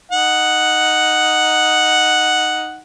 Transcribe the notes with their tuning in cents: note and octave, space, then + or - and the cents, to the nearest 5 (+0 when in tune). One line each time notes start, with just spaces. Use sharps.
D#4 +0 F#5 +0